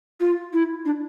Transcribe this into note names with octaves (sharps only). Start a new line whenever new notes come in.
F4
E4
D4